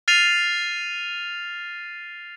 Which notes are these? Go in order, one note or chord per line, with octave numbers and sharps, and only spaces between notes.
F6 A6 C7 D#7 F7